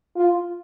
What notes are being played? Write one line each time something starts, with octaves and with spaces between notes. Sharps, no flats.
F4